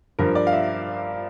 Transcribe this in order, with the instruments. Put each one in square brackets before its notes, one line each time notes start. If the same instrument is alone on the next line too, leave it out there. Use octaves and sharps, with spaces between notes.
[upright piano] G2 F3 A#4
D5
F5
E5